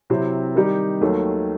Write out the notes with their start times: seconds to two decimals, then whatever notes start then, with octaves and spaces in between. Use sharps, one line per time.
0.10 C3 F#3 C4 E4 G4
0.55 D#3 G3 D#4 G4
1.01 D#2 D#3 F#3 A3